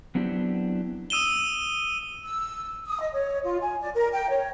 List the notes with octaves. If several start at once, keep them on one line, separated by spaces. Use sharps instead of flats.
F#3 B3 C4 D4 E4 G4
D#6 E6 D#7 E7 G7
E6
D#6
D#5
C#5
F4
G#5
D5
A#4
G5
C#5